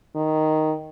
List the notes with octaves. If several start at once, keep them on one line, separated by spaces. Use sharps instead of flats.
D#3